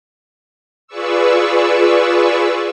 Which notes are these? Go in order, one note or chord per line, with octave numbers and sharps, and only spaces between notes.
F4 G#4 B4 D5 C#6 E6